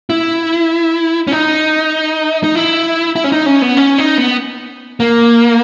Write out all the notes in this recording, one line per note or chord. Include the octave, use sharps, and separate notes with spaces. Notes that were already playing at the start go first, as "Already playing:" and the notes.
E4
C#4
D#4
D#4
E4
E4
C#4
D#4
C#4
B3
C#4
D#4
B3
A#3